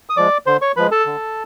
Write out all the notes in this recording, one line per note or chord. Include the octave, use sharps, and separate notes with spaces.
D#6
F3 G#3 D5 D6
D3 C5 C6
C#5 C#6
F3 G#3 B4 B5
A4 A5
D3